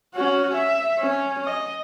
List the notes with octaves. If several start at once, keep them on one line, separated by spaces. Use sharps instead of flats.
C#4 F#4
E5
C#4
D#5